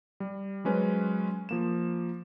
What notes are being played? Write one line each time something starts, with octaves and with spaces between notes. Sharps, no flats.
G3
F#3 G#3 C#4 B4 C5
F3 A#3 E7